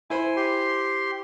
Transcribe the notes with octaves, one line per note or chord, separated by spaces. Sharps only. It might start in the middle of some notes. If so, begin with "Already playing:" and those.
E4 C5 G#5 B5
G4 C6